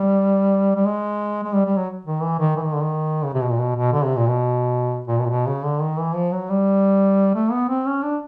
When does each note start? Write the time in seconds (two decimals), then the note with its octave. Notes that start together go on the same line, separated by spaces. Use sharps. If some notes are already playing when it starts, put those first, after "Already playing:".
Already playing: G3
0.75 G3
0.86 G#3
1.43 G#3
1.53 G3
1.65 G3
1.77 F#3
2.05 D#3
2.23 E3
2.39 D#3
2.56 E3
2.65 D#3
2.73 D3
2.81 D#3
3.25 C#3
3.34 C3
3.42 B2
3.51 A#2
3.59 B2
3.76 B2
3.93 D3
4.05 C3
4.16 A#2
4.28 B2
5.08 A#2
5.19 B2
5.25 A#2
5.30 B2
5.47 C#3
5.64 D3
5.81 D#3
5.99 E3
6.15 F3
6.32 F#3
6.50 G3
7.35 A3
7.52 B3
7.69 C4
7.86 C#4
8.03 D4